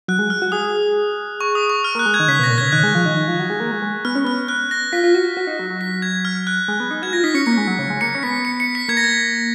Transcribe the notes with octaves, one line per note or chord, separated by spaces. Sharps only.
F#3 F#6
G#3
F6
F#4
G#4 D#6
C#6
D#6
C#6
F6
A#3 F#6
G#3
G#6
D#3
C#3 B6
B2 A#6
A#2
C#3 G#6
D#3 F#6
G#3
F3
D#3
D#3
F3
F#3
G#3
A#3
G#3
G#3
B3 F6
C#4
B3 F6
F#6
A#6
F4 B6
F4
F#4
F#4
D#4
F#3
F#3
B6
G#6
F6
F#6
G#3
B3
D#4
F#4 G#6
F4 A#6
D#4 B6
C#4 C#7
A#3 C#7
G#3
F#3
C#3
G#3
A#3 C#7
C#4
B3 B6
C#7
C#7
B6
A#3 G#6
A#6
G#6